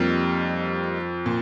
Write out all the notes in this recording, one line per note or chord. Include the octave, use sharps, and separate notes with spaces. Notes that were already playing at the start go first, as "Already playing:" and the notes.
Already playing: F2 G3 A#3 D#4
A#2